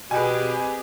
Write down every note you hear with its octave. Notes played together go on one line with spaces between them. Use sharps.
B2 C4 G4 G#4 B4 G#5